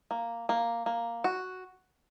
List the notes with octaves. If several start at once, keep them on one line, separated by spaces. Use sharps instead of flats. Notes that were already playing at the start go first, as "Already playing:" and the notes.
A#3
A#3
A#3
F#4